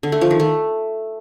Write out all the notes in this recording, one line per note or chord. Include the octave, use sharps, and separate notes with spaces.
D3
A3
F3
D#3
A3